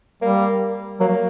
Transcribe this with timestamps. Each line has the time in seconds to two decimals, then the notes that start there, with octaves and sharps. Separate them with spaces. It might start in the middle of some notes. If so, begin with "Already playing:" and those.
0.22 G3 A#3
1.00 F#3 A#3